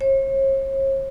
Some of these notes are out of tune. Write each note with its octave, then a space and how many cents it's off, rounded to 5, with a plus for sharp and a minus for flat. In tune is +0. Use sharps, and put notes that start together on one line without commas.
C#5 -45